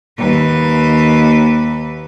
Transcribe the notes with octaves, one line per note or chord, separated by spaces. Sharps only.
D#2 B4